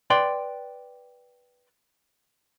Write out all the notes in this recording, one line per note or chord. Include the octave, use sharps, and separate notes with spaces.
B4 D5 G5 C6